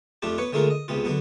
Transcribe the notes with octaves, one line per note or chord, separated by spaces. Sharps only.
F2 A3 D4 F4 G4
B3 B4 C#5
D3 G#3 A3 F4 A#4
D#5
C#2 C3 B3 F4
D3 F#3 B3